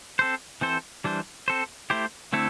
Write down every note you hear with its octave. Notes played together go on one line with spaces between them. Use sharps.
C4 A4 C5
E3 C4 A4 C5
E3 G3 D4 C5
C4 A4 C5
A3 E4 G4 C5
D3 A3 C4 E4 A4